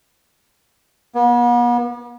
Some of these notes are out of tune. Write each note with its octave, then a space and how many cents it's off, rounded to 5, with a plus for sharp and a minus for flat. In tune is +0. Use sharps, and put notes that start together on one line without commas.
B3 -40